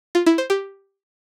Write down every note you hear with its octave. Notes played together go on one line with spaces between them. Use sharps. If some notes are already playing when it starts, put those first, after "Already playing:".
F4
E4
C5
G4